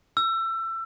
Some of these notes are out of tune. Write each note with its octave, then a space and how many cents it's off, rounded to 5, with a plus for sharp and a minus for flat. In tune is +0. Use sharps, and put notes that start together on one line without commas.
E6 +25